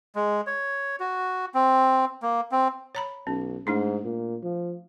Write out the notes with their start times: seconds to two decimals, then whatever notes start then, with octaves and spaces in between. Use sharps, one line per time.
0.15 G#3
0.47 C#5
1.00 F#4
1.54 C4
2.22 A#3
2.52 C4
2.95 C#5 A#5 B5
3.27 B1 C#4
3.67 G#2 A3 D4 E4
4.05 A#2
4.43 F3